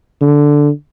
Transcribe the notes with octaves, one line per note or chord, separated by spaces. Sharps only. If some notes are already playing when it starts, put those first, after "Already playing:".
D3